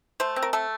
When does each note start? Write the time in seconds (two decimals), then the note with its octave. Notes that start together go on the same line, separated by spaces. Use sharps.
0.20 A3 C5
0.36 C4
0.43 A#4
0.53 A3 A4